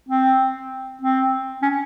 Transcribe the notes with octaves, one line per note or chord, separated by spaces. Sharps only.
C4
C4
C#4